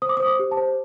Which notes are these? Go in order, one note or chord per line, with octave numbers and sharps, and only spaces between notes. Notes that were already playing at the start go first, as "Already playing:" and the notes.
C5 D#6
D6
D#6
C5
D6
G4
A5
C5